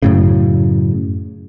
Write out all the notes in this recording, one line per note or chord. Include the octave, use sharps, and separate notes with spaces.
F#2 A2 C#3